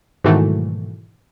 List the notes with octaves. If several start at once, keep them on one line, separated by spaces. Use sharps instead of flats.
G#2 B2 D#3 E3 F#3 A3